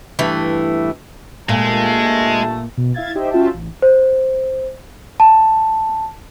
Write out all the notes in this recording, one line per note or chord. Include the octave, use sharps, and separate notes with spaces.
G2 E3 A3
G2 A#2 G#3 A3 A5
B2
E4 E5 F5 G#6 A6
D#4 G4 C5 D#5 E5 G5
C#4 F4 F#4 E5 G5 A5
A1
C5
A5